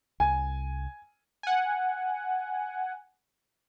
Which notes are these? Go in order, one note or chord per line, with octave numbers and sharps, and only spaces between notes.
C2 G#5
F#5 G#5